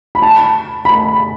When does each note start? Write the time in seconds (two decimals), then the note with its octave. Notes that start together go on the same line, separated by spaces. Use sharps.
0.15 B5
0.22 A5
0.85 B5